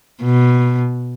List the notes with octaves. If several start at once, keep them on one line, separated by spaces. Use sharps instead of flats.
B2